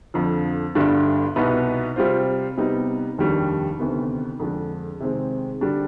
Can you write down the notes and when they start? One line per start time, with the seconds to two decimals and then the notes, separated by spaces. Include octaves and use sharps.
0.14 F2 D3 F3
0.75 G1 G2 D3 G3 D4
1.36 C2 B2 B3 D#4 B4
1.96 C3 G3 C4 F4 C5
2.57 C3 G3 B3 D#4
3.18 F1 D#2 D#3 G3 D4
3.79 D2 C3 D#3 B3
4.40 F2 D3 G#3 D4
5.00 C3 D#3 G#3 C4
5.61 D3 G3 D4